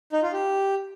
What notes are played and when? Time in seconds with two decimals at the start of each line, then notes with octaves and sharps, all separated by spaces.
0.12 D#4
0.22 F4
0.33 G4